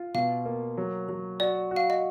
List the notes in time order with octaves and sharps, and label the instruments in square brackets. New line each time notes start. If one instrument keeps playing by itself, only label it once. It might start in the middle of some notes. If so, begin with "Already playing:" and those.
Already playing: [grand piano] F4
[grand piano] B2 [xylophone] F5
[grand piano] A#3
F#3
F#3
[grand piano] F#4 [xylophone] D5
[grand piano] F#4
[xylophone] F5
D#5